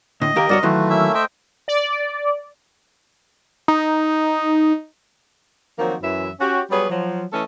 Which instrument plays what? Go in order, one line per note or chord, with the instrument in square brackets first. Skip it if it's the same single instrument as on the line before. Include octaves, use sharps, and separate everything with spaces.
[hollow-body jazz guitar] A2 D3 [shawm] D#5
[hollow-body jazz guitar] D#2 G4 A#4 [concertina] A#3
[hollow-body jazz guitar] G2 F#4 C#5 [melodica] A#4 [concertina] D5
[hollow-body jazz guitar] D#3 E3 F#3 [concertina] A3 [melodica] F4 F#4 B4
[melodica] A#3 C#4 E4 [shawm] E5
[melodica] C5 D#5 G5 [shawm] E5
[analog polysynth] D5
[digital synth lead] D#4
[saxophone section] D#3 F3 F#3 A#3 C4 F#4
F#2 E3 E5
C#4 F#4 G4
F#3 G3 B3 G#4 B4 C#5
F3 F#3
E3 A3 C#4 A4 D#5